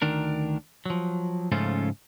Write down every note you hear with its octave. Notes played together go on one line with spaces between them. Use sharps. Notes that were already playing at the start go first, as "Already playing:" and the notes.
D2 D#3 D4 A#4
F3 F#3
G#2 C#3 F3 A3 C#4 F4